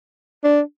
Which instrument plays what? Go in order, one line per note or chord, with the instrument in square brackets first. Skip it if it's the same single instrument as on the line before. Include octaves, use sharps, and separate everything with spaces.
[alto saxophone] D4